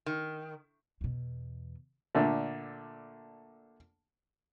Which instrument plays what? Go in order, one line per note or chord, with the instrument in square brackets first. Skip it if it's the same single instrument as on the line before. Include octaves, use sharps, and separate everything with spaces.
[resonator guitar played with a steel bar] D#3
[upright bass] E2 B2
[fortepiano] A#2 D3 A3